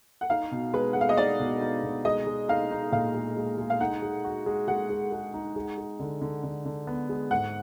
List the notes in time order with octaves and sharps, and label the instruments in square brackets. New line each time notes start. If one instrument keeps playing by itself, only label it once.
[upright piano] F#5
[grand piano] D#4 [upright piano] F5
[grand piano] B2
[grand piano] G#3 [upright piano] B4
[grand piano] G#3 [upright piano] F#5
[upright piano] F5
D#5
[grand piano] D#4 [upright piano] D5
[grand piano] B2
D#4
B2
[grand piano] G#3 [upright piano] D#5
[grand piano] G#3
[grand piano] D#4 [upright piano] F5
[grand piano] D#4
[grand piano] A#2 [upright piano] F5
[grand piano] G#3
G#3
G#3
[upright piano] F5
[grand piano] D#4 [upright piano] F#5
[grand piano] G#3
F#4
G#3
[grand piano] G#3 [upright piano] F#5
[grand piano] G#3
G#3
D#4
G#3
G#3
D3
D3
D3
D3
B3
G#3
[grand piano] G#2 [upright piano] F#5